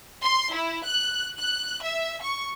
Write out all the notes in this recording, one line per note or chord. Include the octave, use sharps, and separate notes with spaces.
C6
E4
F#6
F#6
E5
C#6